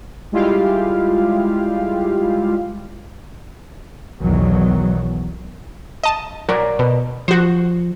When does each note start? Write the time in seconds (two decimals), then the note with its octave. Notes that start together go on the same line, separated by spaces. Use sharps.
0.32 G3 G#3 E4 F4 G4 F5
4.20 B1 E2 D#3 F#3
6.03 D#5 A5
6.49 F#3 A#4 D5 A#5
6.79 B2
7.28 F3 F#4 C5